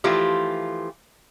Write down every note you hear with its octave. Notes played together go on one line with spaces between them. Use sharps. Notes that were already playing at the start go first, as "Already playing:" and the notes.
E3 F3 A3 F4 G4